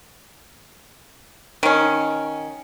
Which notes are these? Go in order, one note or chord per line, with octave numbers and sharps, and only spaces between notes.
D#3 C#4